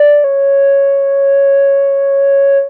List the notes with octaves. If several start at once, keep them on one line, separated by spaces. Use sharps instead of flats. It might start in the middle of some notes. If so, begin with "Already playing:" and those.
Already playing: D5
C#5